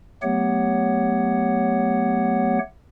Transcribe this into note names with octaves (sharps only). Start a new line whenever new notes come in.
F#3 A3 B3 G4 C#5 F#5